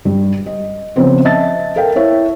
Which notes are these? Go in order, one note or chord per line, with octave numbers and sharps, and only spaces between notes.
G2 G3
D#5
C#3 F3 B3 C4 C5
D#5 E5 A5 A6
A4 A#4 F5 G5
E4 C#5 E5